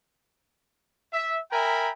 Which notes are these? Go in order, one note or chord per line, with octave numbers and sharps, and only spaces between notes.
E5
A#4 E5 G5 G#5 A#5 B5